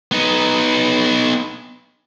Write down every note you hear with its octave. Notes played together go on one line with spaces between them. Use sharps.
B3 D#4